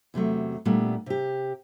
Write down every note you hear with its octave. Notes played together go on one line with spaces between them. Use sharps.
E2 C3 F#3 A3
A#2 G3 A3 B3 D4
C3 G4